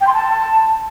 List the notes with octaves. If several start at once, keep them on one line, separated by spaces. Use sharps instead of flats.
G5
C6
A5